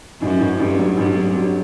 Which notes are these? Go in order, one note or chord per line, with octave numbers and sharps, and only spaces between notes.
A1 F#2
A1
A1 G2
F#3
A1 G2
F#3
F#3